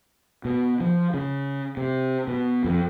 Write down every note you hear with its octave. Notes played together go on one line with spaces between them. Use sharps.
B2
F3
C#3
C3
B2
F2